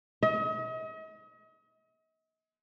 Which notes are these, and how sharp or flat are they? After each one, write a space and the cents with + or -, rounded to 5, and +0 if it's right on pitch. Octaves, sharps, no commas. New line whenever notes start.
D#5 +40